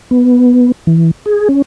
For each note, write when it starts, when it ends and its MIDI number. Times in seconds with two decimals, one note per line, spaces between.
0.11 0.72 59
0.87 1.11 52
1.26 1.48 68
1.49 1.62 61